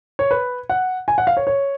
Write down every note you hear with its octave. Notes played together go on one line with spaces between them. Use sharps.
C#5
B4
F#5
G#5
F#5
F5
C#5
C#5